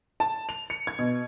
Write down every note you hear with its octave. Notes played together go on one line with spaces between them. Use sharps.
A5
F7
C#7
G#6
B2